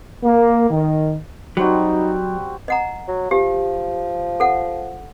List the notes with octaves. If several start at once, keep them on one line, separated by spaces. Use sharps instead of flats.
A#3
D#3
F#3 G3 C4 D#4 F#4
D#5 F#5 A#5
F#3
F3 G4
A4 F#5